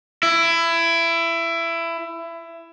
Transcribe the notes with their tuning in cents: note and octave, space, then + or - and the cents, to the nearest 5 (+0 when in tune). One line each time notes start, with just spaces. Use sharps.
E4 +20